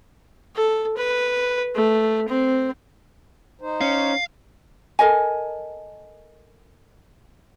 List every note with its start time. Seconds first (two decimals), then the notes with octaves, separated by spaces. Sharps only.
0.56 A4
0.97 B4
1.75 A3
2.28 C4
3.61 D#4 C5
3.81 C#4 F5
4.99 A4 A#4 D#5 G#5